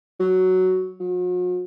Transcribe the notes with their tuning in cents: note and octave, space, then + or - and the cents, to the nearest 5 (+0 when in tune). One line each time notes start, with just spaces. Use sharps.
F#3 +5
F#3 -45